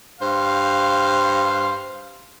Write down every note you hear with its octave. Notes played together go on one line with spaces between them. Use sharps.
G2 C5 F5